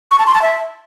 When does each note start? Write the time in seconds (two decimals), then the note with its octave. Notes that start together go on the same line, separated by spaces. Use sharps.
0.11 C#6
0.19 A5
0.27 C6
0.34 A5
0.42 E5